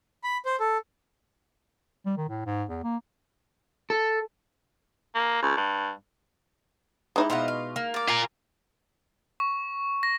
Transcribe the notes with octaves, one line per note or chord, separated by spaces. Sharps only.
B5
C5
A4
G3
D#3
A2
G#2
E2
A#3
A4
A#3
C#2
G2
G#3 D#4 E4 G4
B2 F4 C5 E5 F#5
F5
A#3
D5 D6
F4 A#4 G#5
C#6
A#6